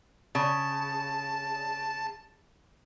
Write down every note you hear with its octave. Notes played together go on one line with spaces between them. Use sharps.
C#3 A5